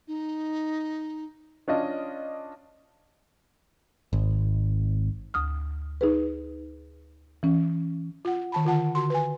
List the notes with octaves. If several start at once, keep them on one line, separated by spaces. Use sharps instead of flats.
D#4
C#4 D4 F4 D#5
G#1
D2 D#6 F6
D#4 G#4 B4
E3 C#4
F4 F#5
D#3 A5 B5
D3 F4 F#5 A5
D3 F#4 C6
B4 G#5